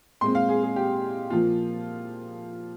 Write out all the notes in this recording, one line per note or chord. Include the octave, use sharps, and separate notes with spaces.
A#2 G#3 C4 C6
F5
G#4
G#4
G4
A#2 F3 A#3 F4